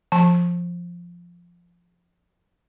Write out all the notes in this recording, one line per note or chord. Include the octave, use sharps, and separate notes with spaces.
F3 A5